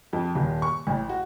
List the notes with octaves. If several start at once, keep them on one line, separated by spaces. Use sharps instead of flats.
F2
D#1
C#6
A1
F#4